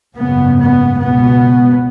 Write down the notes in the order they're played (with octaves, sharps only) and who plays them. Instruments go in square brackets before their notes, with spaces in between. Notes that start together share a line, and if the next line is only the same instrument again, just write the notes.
[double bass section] G#1 F#2 C#3 B3
B3
C#2 B2 B3